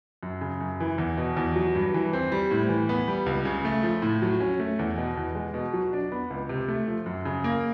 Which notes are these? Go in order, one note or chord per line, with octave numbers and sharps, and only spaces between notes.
F#2
C#3
F#2
E3
E2
B2
E2
F#3
G2
E3
C4
G3
A2
E3
B3
G3
C#2
C#3
A3
F3
A2
F#3
C#4
A3
E2
B2
E2
G#3
B2
F#3
D4
B3
C#2
C3
A3
F3
F#2
C#3
A#3